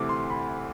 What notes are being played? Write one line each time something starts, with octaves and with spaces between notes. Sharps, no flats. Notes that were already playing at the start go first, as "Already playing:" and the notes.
Already playing: D2 C3 E3 A3 D6
C6
B5